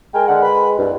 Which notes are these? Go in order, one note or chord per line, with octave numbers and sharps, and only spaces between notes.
G#3 A#4 G5 G#5
D3 F#5
B4 B5
C2 G2